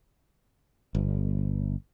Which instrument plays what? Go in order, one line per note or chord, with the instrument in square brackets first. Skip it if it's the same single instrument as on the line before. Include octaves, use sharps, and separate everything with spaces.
[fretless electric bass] G1